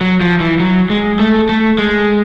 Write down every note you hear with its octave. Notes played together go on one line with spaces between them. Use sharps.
F#3
F3
E3
F#3
G#3
A3
A3
G#3